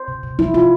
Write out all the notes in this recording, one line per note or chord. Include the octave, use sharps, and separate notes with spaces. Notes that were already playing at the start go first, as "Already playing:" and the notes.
Already playing: C5
C3
C3
F3 E4
C3 F4